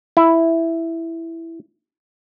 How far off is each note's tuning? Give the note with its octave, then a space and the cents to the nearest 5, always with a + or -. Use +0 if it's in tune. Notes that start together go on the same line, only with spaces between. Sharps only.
E4 +5